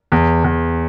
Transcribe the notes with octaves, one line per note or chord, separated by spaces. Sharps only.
E2
E2